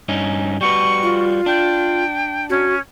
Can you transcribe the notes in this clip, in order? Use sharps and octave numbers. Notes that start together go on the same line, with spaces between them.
G2 C#4 D#4
G3 F#4 B4 C#6
F4
D4 G5
C#4 F#4